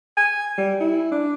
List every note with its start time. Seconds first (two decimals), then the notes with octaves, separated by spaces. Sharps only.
0.17 G#5
0.58 G3
0.80 E4
1.12 D4